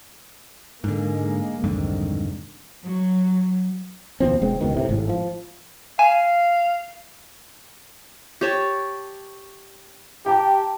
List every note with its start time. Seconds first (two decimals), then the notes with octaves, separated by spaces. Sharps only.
0.84 G#2 D3 G#3 A#3
1.64 C2 F2 G#2 D3 D#3
2.83 F#3
4.20 D#2 B2 F3 C4
4.42 E1 G#3 C4
4.61 C#2 B2 D#3
4.74 A2 C3
4.89 G#1 A2
5.09 F3
5.99 F5 G#5 E7
8.41 G4 C#5 A5
10.26 G4 G5 A5 A#5